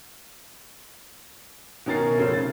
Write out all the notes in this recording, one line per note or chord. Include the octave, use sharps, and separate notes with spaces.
B2 D#3 C#4 A#4 A6 C7
F1 C#3 C5
A6